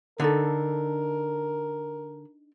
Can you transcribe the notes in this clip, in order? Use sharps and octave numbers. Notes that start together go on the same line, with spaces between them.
D3 D4 D#4 A4 A#4